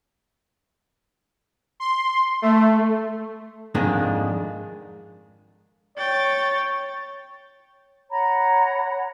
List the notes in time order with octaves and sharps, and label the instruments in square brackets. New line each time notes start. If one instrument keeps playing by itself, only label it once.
[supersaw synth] C6
A3
[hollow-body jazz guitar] F2 G#2 D#3 G#3 A#3 D4
[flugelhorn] C#5 [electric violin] G5 A6
[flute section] C#5 F#5 A#5 B5